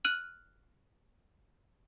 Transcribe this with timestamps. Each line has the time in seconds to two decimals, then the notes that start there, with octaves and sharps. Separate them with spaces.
0.05 F6 F#6 D#7 F#7